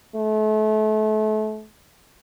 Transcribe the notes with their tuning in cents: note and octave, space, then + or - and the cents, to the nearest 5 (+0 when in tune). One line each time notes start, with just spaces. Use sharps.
A3 -35